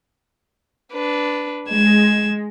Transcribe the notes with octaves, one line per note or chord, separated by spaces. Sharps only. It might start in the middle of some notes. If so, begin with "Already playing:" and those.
D4 B4
G#3 G#6 E7